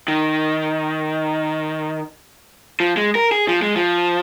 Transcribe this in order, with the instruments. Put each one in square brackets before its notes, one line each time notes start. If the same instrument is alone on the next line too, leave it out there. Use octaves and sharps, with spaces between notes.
[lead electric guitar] D#3
F3
G#3
A#4
G#4
F3
G#3
F3